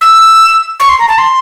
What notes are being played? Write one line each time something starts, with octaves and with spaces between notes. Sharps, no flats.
E6
C#6
C6
A#5
A5
C6